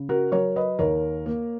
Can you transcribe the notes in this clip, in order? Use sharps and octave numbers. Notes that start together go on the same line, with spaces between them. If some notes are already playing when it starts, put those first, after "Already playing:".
Already playing: C#3
F#4 A#4
F#3 A#4 C#5
B4 D#5
D#2 A#4 C#5
A#3